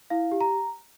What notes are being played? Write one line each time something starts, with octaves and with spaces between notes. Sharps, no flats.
E4 F5
G4
A#5